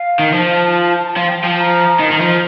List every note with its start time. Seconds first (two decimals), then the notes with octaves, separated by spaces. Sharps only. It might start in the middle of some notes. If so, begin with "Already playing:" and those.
Already playing: F5
0.19 D#3
0.33 F3 A5
1.17 F3 F5
1.27 G5
1.38 G5
1.44 F3 A5
1.59 A#5
2.00 D#3
2.12 D#3
2.21 F3